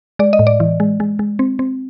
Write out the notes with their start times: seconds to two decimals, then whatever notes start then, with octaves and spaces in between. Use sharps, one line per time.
0.19 G#3 D5
0.33 D#5
0.39 A2
0.47 D5
0.60 E3
0.80 G#3
1.00 G#3
1.19 G#3
1.39 C4
1.59 C4